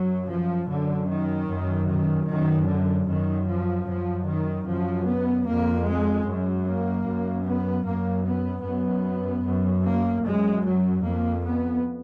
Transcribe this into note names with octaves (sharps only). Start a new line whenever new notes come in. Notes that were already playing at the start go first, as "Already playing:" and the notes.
Already playing: F#2 F#3
F3
F#2 D3
D#3
F#2
D#3
F#2 D#3
D3
F#2 D#3
F3
F#2 F3
D#3
F#2 F3
B3
F2 A#3
G#3
F#2
A#3
F#2
B3
F#2 A#3
B3
F#2 B3
F#2
A#3
F#2 G#3
F#3
F2 A#3
B3